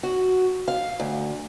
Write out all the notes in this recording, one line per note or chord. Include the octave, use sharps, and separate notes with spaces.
F#4
F5
D2